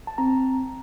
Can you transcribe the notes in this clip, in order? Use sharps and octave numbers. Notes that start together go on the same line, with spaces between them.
A5
C4 A#5